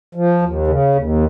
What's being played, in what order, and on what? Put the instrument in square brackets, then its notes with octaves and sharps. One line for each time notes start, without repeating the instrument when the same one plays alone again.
[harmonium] F3
D#2
C#3
D#2